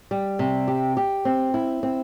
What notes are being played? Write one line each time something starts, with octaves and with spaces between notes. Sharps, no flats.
G3
C3
G4
G4
C4
E4
C4